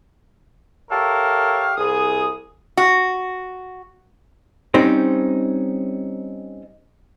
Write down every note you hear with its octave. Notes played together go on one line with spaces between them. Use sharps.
G4 A4 A#4 C#5 E5 F5
C2 G#4 D#6
F#4
G3 C4 C#4 D#4 C5